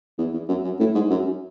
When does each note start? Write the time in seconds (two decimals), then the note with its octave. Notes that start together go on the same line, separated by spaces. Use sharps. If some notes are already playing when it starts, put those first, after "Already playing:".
0.18 E2
0.34 E2
0.48 F#2
0.64 F#2
0.80 A2
0.95 G#2
1.10 F#2